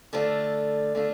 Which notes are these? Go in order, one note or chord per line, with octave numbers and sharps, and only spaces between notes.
D3 A3 D4 F4
D3 A3 D4 F4